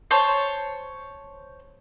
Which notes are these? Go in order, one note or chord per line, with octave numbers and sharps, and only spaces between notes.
C5 C#5 A5